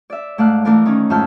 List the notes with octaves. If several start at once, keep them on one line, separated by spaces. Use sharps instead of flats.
D5 E5
G#2 A3 D5 F5 F6 F#6
E3 A3 D4 A#4 D5
D#3 E3 C#4 D#4
F2 G#2 E5 A5 F6 G6